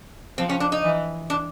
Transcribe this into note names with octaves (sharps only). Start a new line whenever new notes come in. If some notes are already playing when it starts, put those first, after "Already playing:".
F3 C4
C#4
D4
D#4
E3
D4